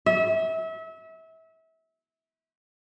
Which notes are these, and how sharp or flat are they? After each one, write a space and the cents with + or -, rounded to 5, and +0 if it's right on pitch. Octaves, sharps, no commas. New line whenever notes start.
E5 -30